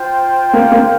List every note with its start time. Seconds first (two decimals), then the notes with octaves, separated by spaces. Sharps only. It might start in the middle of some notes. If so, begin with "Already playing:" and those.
Already playing: F4 C5 G5
0.53 A#3
0.72 A#3